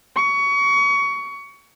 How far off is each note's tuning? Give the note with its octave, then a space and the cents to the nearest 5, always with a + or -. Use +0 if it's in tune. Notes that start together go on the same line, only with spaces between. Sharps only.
C#6 +25